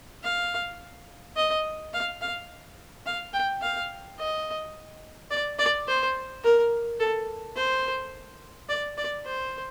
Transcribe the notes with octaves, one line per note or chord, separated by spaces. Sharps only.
F5
D#5
F5
F5
F5
G5
F5
D#5
D5
D5
C5
A#4
A4
C5
D5
D5
C5